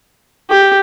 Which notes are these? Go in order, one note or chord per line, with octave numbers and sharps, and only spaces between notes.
G4